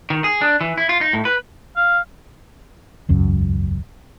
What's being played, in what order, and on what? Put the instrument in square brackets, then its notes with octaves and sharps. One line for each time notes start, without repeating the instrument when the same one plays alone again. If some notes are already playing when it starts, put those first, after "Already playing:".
[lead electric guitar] D#3
G#4
D4
E3
E4
F4
D#4
A2
B4
[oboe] F5
[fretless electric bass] E1 C#2 F#2